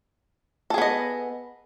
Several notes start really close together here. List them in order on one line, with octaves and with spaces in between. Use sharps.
A4 G#4 B3 D#5